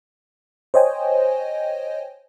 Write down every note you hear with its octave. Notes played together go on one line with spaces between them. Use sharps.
C5 C#5 D#5 G5 G#5